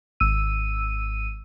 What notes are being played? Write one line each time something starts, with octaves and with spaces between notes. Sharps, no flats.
G#1 E6 D#7